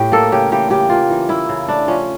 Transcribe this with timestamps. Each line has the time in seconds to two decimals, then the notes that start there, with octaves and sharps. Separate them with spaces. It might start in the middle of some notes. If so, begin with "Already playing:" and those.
Already playing: A2 G4
0.12 A#3 A4
0.32 C#3 G4
0.52 E3 G4
0.70 C#3 G4
0.90 A#3 F4
1.10 E3
1.29 A#3 E4
1.49 C#3
1.68 A3 D4
1.88 F3 C#4